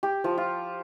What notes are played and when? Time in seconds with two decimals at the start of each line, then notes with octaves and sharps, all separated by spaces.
0.03 G4
0.24 F3
0.38 F4